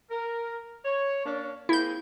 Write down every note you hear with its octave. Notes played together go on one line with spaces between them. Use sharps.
A#4
C#5
A#3 C#4 D4
A#3 C4 E4 G#4 G6